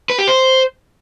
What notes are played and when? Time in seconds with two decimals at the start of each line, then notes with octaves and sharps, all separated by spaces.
0.10 B4
0.19 G4
0.27 C5